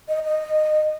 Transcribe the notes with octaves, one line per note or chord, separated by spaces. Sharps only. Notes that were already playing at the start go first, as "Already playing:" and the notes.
D#5
D#5